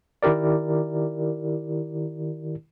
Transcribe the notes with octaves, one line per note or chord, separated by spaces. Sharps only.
D#3 E4 G4 A#4 D5